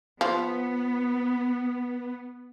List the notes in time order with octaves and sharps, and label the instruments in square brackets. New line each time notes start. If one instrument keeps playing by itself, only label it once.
[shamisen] F3 [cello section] B3